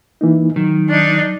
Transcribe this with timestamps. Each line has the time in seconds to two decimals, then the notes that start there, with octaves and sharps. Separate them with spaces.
0.21 E3 A#3 D#4
0.56 D#3 F#3
0.89 D4 D#4